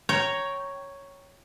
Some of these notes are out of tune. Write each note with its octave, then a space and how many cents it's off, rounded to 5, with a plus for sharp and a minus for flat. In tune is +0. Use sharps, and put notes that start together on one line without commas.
C#5 +0 G5 -15 A#5 +0